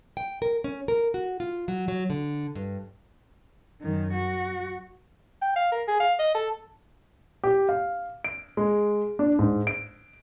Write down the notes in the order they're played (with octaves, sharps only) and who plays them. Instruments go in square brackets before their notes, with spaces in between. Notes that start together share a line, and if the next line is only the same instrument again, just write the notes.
[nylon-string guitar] G5
A#4
C#4
A#4
F#4
F4
F#3
F#3
D3
G2
[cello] F#2 D#3
F#4
[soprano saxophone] G5
F5
A#4
G#4
F5
D#5
A4
[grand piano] G4
F5
D7
G#3
D4
G#2
D7